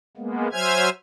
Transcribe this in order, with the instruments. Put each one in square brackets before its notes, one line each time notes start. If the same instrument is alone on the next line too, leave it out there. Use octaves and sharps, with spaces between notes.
[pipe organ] G#3 A#3 B3
F#3 C5 E5 G#5 F6 G#6